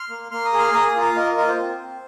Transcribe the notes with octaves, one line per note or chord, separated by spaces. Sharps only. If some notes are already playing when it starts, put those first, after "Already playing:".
Already playing: C6 F6
A#3
A#3 C6 F6
A#5 D#6
G#4
C6 F6
A#3 A#5 D#6
A#5 D#6
F4
F5 A#5
A#3 A#4 D#5
F4 A#4 D#5
C5
C4
C4